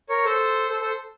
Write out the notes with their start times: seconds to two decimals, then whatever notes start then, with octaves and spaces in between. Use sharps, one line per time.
0.09 A#4 C#5
0.25 A4 C5
0.70 A4 C5
0.81 A4 C5